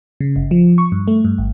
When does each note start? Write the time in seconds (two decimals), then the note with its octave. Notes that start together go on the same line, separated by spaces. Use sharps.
0.21 C#3
0.36 G1
0.51 F3
0.78 C#6
0.92 G2
1.08 A3
1.25 G2
1.38 G#1